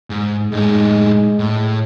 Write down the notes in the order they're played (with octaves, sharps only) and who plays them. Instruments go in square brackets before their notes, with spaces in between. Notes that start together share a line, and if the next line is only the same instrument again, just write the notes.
[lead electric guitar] G#2
[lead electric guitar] A2 D#4 [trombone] G#3
[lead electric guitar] A2